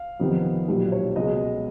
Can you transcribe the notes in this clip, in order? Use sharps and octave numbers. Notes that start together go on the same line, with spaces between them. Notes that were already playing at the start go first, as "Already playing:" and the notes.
Already playing: F5
F2 C3 D#3 G3 B3
B1 A#2 G3
C#5
C#2 B2 G#3 D#5